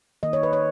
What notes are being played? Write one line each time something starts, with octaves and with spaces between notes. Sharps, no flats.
D#3 A#3 D#5
C#5
B4
C#5